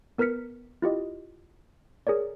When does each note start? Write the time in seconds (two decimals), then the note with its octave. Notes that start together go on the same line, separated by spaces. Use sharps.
0.18 B3 A#4 B4 F6 B6 C#7
0.82 E4 F4 G4 D#5
2.07 G#4 A#4 C#5 D5